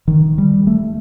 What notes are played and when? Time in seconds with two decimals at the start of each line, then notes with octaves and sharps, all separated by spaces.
0.08 D#3
0.38 G3
0.67 A3